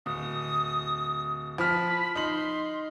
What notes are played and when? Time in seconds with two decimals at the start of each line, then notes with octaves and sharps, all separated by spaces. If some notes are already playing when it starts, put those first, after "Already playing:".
0.06 D1 D#6
1.58 F3 B5 F6
2.15 D#4 C6 F#7